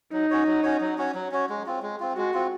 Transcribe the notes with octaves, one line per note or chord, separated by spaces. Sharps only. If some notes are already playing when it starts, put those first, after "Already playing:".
F#3 D#4
C#4 F#4 C#5
F#3
C#4 F#4 C#5
F#3
C#4 F#4 C#5
F#3
C#4 F#4 C#5
G#3
C4 F4
G#3
C4 F4
G#3 F#4
C4 F4